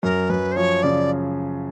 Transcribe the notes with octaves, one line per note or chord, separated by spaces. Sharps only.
F#2 A#4
F#2 B4
C5
F3 C#5
C#3 D5